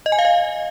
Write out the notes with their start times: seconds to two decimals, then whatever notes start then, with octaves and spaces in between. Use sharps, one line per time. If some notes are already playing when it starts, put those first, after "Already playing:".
0.06 D#5
0.12 G#5
0.19 F5
0.25 D#5